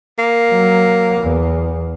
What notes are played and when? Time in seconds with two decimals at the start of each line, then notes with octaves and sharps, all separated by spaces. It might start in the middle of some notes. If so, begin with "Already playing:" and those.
0.19 A#3
0.51 F#3
1.20 E2